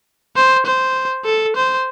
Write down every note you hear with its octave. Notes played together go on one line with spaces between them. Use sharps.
C5
C5
A4
C5